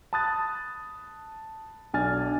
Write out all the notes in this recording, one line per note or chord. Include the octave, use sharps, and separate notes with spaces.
A5 B5 D#6 F#6 A6
B1 D4 G#5 F6 A6